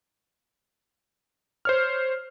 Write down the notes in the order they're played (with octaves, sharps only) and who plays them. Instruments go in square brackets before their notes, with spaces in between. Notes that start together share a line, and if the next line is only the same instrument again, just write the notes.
[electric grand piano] C5 C#5 F6